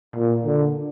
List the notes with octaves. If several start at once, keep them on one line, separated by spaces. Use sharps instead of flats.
A#2
D3